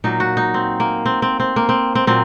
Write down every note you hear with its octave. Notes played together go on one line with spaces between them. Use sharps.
A#2 F#3 A#3 D#4
F#4
D#4
C4
A#3
C4
C4
C4
A#3
C4
C4
A#2 F#3 A#3 C4